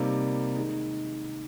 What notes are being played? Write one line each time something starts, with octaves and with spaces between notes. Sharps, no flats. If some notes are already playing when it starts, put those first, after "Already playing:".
Already playing: C3 G3 A#3 D#4
D#3 G#3 D#4